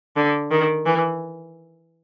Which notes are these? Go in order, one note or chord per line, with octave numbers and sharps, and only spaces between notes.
D3
D#3
E3